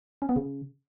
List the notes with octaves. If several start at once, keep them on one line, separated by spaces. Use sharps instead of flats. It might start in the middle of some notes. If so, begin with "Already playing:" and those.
C#4
B3
C#3